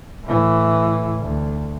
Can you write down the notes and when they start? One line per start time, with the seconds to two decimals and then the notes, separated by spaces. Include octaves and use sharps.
0.24 A2 E3
1.19 D2